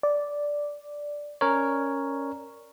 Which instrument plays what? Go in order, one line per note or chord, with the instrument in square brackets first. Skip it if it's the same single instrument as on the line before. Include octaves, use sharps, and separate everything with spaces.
[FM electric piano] D5
[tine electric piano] C#4 A#4 C#5